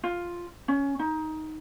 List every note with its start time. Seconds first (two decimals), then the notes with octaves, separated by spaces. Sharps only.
0.04 F4
0.68 C#4
0.99 D#4